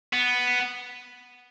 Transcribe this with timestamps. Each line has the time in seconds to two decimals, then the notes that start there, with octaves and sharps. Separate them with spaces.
0.13 B3